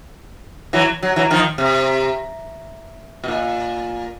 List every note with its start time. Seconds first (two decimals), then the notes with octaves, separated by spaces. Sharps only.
0.73 E3 F#3
1.02 F#3
1.16 E3 F#3
1.30 D#3 F3
1.58 C3
3.24 B2
3.28 A#2